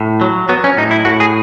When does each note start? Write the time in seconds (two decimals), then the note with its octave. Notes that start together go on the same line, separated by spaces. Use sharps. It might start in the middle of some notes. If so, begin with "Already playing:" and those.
Already playing: A2
0.21 F#3
0.49 F#3 B3
0.64 C#4
0.77 A2 D#4
0.91 E4
1.05 A2 F#4
1.20 G#4